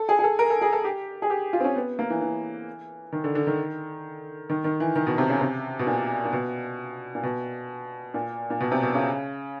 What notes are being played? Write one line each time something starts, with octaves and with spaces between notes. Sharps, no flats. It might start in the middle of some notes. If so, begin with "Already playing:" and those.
Already playing: A4
G#4
G#4
A4
A#4
A4
G#4
A4
G4
G#4
G4
F4
C4
C#4
B3
A#3
E3
E3
D#3
D3
D3
D#3
D#3
D#3
E3
D#3
B2
C3
C#3
C3
B2
A#2
A#2
B2
A#2
B2
A#2
A#2
B2
C3
B2
C#3